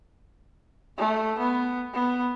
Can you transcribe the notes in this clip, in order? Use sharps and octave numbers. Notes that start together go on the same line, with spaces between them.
A3
B3
B3